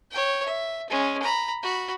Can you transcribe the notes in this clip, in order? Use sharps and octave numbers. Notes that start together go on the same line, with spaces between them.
C#5 G5
E5
G#3 C#4
A#5 B5
F#4 B5